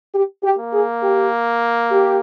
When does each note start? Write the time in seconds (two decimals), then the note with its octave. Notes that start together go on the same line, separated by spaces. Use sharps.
0.14 G4
0.43 G4
0.59 A#3
0.73 G#4
1.03 G4
1.91 G4